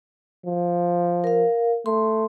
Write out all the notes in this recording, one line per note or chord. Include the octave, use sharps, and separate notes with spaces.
F3
A#4 F5
A3 C6